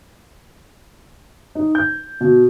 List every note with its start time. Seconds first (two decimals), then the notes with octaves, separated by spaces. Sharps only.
1.55 D#4
1.75 G6
2.21 B2